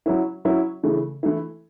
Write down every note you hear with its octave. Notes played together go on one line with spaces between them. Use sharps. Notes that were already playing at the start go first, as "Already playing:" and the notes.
F#3 C#4 E4
F#3 C#4 E4
C#3 E3 A3
E3 A3 E4